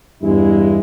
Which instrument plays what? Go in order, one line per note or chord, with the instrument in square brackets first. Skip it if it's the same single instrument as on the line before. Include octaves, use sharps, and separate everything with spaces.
[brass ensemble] E2 G2 G#3 E4